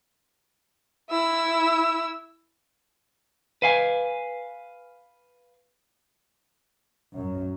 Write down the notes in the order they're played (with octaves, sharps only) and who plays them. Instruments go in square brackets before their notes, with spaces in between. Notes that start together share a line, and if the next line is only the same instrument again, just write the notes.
[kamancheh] E4 E6
[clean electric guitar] B4 F5 G#5
[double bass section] F#2